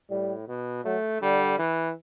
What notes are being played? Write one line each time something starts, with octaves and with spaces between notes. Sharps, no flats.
A2 G3
B2
F#3 A3
D3 G3
E3